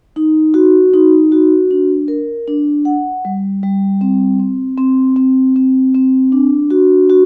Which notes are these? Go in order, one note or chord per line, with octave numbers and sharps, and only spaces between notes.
D#4
F#4
D#4
F#4
D4
A#4
D4
F#5
G3
G3
C4
C4
C4
C4
C4
C4
D4
F#4
F#4